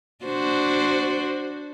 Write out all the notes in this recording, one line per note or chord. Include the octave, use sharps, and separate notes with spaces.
D4 F#4 C5